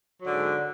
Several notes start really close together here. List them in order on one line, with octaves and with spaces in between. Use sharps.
F#3 D3 G#2